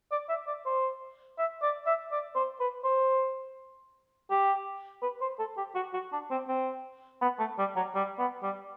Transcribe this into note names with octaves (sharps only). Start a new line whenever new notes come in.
D5
E5
D5
C5
E5
D5
E5
D5
C5
B4
C5
G4
B4
C5
A4
G4
F#4
F#4
D4
C4
C4
B3
A3
G3
F#3
G3
B3
G3